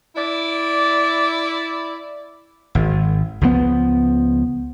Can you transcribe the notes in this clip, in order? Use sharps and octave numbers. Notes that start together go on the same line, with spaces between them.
E4 D5
G#1
C#2 F3 B3